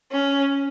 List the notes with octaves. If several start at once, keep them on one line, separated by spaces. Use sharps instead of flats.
C#4